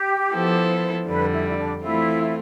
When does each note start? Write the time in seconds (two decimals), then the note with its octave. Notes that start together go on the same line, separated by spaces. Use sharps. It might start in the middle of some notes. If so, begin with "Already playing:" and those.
Already playing: G4
0.32 F3 B3 E4 A4 C5
1.07 F2 D3 G3 B4
1.32 E4
1.49 E4
1.57 D4
1.82 E3 A3 C4 E4 F4